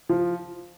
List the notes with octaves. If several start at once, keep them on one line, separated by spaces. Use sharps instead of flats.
F3